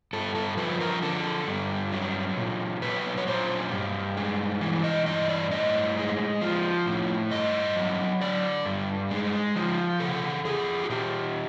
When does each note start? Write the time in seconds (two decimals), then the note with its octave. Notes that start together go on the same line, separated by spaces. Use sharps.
0.13 G2 A4
0.35 A4
0.57 F3 B4
0.80 A#4
1.02 D3 A4
1.47 G2
1.92 F#3
2.37 A#2
2.82 F#3 B4
3.17 C#5
3.27 A#2 C5
3.72 G2
4.17 G#3
4.61 E3
4.84 D#5
5.06 G2 D#5
5.29 D5
5.51 A2 D#5
5.97 G#3
6.41 F3
6.86 A2
7.31 G2 D#5
7.76 F#3
8.21 D3 D5
8.66 G2
9.11 G#3
9.56 F3
10.00 C#3 A4
10.45 F2 G#4
10.84 F#4
10.90 A#2 G4